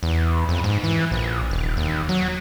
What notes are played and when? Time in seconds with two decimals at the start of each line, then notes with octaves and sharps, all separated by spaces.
0.03 E2
0.49 F2
0.64 G#2
0.84 E3
1.11 A#1
1.51 D#1
1.77 D#2
2.09 F#3